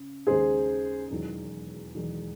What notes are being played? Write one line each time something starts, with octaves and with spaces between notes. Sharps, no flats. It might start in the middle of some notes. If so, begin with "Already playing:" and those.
Already playing: C#3
D#2 C#3 G#3 D#4 G#4 C5
E1 E2 D#3 F#3
E1 E2 D#3 F#3